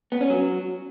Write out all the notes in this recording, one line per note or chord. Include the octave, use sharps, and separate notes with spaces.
B3
C#4
F#3